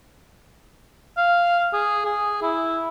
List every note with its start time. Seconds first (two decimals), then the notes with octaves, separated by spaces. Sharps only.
1.17 F5
1.73 G#4
2.05 G#4
2.42 E4